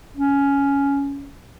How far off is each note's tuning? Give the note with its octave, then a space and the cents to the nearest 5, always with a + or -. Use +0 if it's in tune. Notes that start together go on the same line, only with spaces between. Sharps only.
C#4 +10